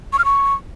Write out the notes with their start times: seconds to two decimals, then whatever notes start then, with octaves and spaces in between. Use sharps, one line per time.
0.13 C#6
0.19 F6
0.25 C#6